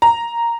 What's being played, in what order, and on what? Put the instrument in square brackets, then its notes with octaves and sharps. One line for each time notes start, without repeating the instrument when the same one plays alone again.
[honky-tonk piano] A#5